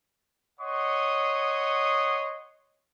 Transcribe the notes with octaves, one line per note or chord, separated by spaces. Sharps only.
C#5 D#5 F#5 C6 C#6 D#6